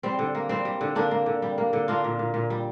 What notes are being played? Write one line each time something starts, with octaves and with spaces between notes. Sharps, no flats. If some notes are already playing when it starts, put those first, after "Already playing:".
G3 C4
D3
A#3
G3 C4
G3
D3
D3 A#3 D4
A#3
D3
G3
A#3
D3
A#3 D4 F4
A#2
A#2
A#2
G3